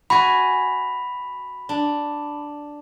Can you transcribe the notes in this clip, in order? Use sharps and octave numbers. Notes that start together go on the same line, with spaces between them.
F#4 G#5 B5
D4